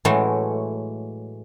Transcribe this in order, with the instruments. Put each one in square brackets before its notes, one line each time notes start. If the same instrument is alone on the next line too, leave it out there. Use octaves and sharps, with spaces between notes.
[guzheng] A2 E3 F#3 G#3 A3